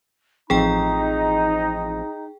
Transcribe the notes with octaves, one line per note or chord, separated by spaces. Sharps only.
A1 F3 C4 D#4 G#4 G5 A#5